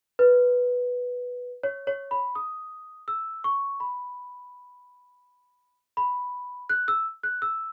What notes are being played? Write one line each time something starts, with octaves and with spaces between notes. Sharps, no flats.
B4
C#5
C#5
B5
D#6
E6
C#6
B5
B5
F#6
E6
F#6
E6